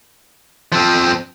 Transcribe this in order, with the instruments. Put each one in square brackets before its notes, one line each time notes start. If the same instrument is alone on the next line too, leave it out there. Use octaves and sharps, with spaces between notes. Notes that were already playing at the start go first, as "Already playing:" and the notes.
[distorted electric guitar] F3 C4